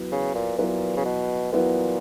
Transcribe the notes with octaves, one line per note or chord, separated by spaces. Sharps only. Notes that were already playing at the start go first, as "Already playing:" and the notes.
Already playing: F#3 B3 E4 B4
C#3
A#2
A#2 F#3 B3 E4 B4
C#3
B2
A#2 F#3 B3 E4 B4